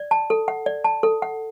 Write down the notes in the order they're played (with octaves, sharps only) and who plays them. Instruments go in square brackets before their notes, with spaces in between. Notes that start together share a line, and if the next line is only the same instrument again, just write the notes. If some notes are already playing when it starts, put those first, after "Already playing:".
Already playing: [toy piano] D5
A5
A4
F#5
D5
A5
A4
F#5